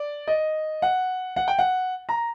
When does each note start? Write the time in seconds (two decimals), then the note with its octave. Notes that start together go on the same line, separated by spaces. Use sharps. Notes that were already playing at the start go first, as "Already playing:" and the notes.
Already playing: D5
0.28 D#5
0.82 F#5
1.36 F#5
1.48 G5
1.59 F#5
2.09 A#5